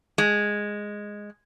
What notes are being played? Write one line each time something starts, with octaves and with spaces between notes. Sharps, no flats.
G#3